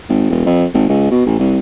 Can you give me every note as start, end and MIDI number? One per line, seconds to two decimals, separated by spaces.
0.09 0.29 32
0.30 0.41 28
0.46 0.65 41
0.74 0.85 32
0.89 1.08 37
1.11 1.24 47
1.27 1.34 33
1.39 1.59 36